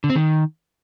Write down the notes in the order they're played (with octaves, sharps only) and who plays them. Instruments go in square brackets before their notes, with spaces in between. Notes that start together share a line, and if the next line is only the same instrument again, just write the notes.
[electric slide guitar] D3
C4
D#3